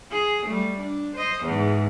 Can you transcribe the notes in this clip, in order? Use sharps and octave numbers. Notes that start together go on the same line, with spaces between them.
G#4
G3 A3
D4
C5 D#5
E2 G#2